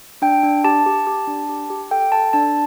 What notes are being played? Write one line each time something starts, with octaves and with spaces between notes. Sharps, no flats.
D4 G5
D4
G4 A5
G4
G4
D4
G4
G4
A4 G5
A4 A5
D4 A5